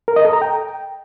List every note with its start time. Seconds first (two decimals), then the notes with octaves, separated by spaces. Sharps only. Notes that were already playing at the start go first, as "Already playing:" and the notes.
0.08 A#4
0.16 D#5
0.25 A4
0.33 A#5
0.42 G5